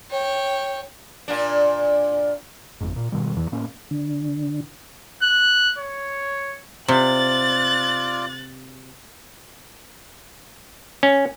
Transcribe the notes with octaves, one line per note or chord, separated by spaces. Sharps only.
C#5 G5
A#2 D4
G#1 F2 G#2
A#2
G#2 B2 D#3 G3
E2 E3
A2 A#3 C#4
D3
F#6
C#5
C3 F4 D5 F#6 A6
C#4